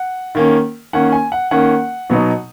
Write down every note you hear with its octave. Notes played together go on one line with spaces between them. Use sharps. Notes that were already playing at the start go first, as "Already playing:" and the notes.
Already playing: F#5
D#3 A#3 C#4
D#3 A#3 C#4 F#5
G#5
F#5
D#3 A#3 C#4 F#5
B2 F#3 B3 D#4